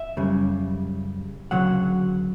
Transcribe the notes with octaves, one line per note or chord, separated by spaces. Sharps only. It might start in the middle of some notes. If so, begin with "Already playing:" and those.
Already playing: E5
F#2 C#3 G3
D2 C#3 F#3 F#5